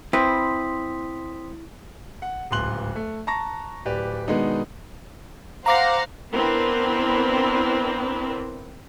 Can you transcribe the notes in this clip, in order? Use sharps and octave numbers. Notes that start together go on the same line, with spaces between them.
C4 E4 B4 C6 D#6 B6
F#5
D1 C#2 G#2 C6 F#6 F#7
A3
A5 A#5 C#6 A#6
D1 G4 B4 D5
B2 D#3 G#3 B3 D4 D#4
C5 F5 F#5 A#5 D6 A#6
B3 C4 D4 E4 A#4 B4